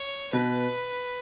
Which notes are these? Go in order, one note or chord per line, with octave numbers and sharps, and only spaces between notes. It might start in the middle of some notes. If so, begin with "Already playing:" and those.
Already playing: C#5
B2 B4